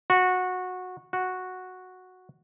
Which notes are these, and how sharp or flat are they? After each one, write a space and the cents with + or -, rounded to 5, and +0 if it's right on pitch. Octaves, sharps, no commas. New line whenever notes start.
F#4 -15
F#4 -5